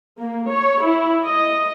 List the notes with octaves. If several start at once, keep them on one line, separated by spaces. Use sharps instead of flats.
A#3
C#5
E4
D#5